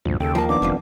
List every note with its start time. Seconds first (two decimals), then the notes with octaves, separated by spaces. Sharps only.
0.05 D2 G2 A#2 F3
0.20 D#2 C#3 A4 G5
0.35 F3 A#3 A5
0.49 D#3 B3 D4 D6
0.62 F1 F2 G#2 F3